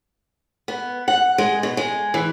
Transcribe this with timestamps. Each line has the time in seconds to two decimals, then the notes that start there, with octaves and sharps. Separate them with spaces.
0.68 B3
1.08 F#5
1.38 G#3
1.63 B2
1.77 G#3
2.14 E3